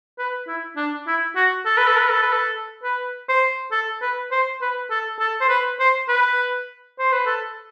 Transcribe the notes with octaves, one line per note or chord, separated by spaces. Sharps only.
B4
E4
D4
E4
F#4
A4
B4
A4
B4
A4
B4
A4
B4
C5
A4
B4
C5
B4
A4
A4
C5
B4
C5
B4
C5
B4
A4